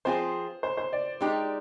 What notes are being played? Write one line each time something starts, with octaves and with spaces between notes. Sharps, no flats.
F3 C4 F4 G#4 C5
C5
C5
D5
G#3 D#4 G4